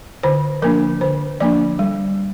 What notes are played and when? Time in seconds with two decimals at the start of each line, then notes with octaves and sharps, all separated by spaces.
0.23 D3 C5
0.62 F3 A#3 D4 A#4
1.01 D3 C5
1.40 F3 A#3 D4 D5
1.79 G3